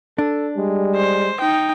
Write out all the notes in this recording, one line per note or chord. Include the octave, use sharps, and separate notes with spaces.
D4 A4
G3 G#3
C5
D#4 G5